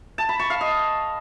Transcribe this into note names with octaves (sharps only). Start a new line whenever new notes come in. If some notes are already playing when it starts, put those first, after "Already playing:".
A5
B5
C#6
F5
D#5